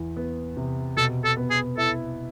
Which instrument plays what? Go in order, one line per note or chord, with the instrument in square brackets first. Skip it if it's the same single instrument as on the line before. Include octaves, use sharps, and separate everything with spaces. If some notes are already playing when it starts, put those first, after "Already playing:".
Already playing: [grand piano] E2 E3
B3
C3
[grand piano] B2 [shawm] A4
[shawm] A4
[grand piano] B3
[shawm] G#4
[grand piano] E4 [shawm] A4